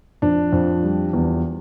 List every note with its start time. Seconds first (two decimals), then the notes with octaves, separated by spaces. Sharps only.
0.22 F2 D4
0.52 F2
0.83 G3
1.13 E2